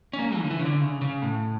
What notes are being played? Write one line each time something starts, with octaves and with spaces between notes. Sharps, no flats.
C#4
A#3
E3
D3
E3
C#3
D3
C#3
C#3
A2